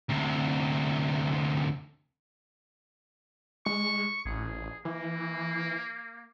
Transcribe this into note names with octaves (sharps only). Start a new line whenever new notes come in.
D2 C3
G#3 C#6
A1 G#4
E3 A#3